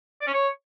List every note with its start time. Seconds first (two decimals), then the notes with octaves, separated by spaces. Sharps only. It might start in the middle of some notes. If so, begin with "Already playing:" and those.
0.21 D5
0.27 C#4
0.33 C#5